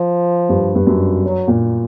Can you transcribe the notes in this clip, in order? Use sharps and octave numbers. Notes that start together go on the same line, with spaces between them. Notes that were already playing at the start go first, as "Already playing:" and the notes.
Already playing: F3
G2
G2
F#2
F#3
A#2